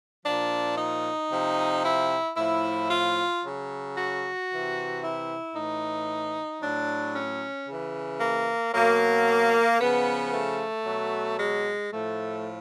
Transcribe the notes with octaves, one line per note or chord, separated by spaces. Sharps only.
A#2 F3 D4
D#4
C3 F3
E4
A2 F3 E4
F4
C#3 F#3
F#4
C3 E3
E4
A2 E3 D#4
A2 F#3 D4
C#4
C#3 E3
A#3
B2 F#3 A#3
C#3 F3 B3
A3
B2 F#3
G#3
A2 F3 A3